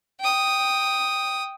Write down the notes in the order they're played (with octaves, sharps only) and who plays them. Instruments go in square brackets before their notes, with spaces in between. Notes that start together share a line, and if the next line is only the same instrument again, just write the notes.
[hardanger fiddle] G5 D#6